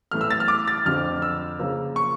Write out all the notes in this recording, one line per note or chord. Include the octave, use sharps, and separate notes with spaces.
A2 E3 A3 F6
E6
A6
F6
D6
A6
F2 D3 F3 F6
E6
C#3 F3 A#3
C#6